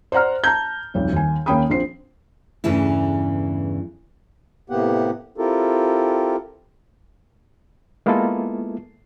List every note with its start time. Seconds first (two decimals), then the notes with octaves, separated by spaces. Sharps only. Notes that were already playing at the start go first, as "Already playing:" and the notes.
0.12 C5 D5 F#5 A#5 F6
0.44 A5 A#5 G6
0.94 D#1 B1 F2
1.13 D#2 G#5
1.46 D#2 A#3 C#4 G5 B5 D#6
1.70 A#1 C4 C5 C7
2.64 E2 G2 C#3 E3 A3 E4
4.70 A2 C3 A#3 B3 G4 F#5
5.38 C4 E4 F4 G4 A4 A#4
8.06 G#3 A#3 B3 E4 F4 A4